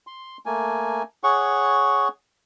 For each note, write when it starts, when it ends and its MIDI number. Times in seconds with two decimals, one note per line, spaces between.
0.07 0.37 84
0.46 1.03 57
0.46 1.03 58
0.46 1.03 80
1.24 2.08 68
1.24 2.08 73
1.24 2.08 78
1.24 2.08 85